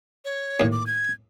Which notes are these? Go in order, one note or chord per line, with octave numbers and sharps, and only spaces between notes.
C#5
D#2 A2
D6
G#6